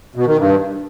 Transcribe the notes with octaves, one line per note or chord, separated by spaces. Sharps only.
B2
D#3
G2